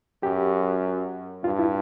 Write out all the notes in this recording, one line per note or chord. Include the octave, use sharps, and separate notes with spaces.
F#2 G4
G2 F4
E4